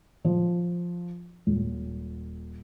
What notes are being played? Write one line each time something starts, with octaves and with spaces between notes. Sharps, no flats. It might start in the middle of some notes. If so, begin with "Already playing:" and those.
F3
D#1